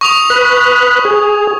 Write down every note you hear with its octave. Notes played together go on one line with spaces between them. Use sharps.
C#6 D#6 F7
B4 F#6
G#4